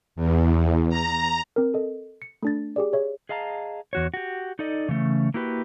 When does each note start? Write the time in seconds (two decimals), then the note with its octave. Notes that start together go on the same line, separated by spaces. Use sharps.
0.16 E2
0.89 A#5
1.56 C4 A#4
1.74 A4 D#5
2.22 C#7
2.43 A3 D4 A6
2.76 G4 G#4 D5
2.93 G#4 C#5 E5
3.29 G#4 D#5 F5 A5 A#5
3.93 E2 F#4 C#5
4.14 F#4 G4
4.59 D#4 A4 D5 D#5
4.89 C#3 E3 A3 C#4
5.34 A#3 E4 F#4 G4 B4